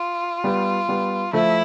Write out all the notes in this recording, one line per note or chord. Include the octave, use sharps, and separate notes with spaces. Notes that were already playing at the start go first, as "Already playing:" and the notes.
Already playing: F4
G3 B3
G3 B3
F3 A3 E4